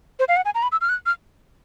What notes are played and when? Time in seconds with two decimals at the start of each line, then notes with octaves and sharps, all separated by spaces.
0.19 C5
0.28 F5
0.37 F#5
0.45 G#5
0.55 A#5
0.63 B5
0.72 E6
0.81 F6
0.89 F#6
1.06 F6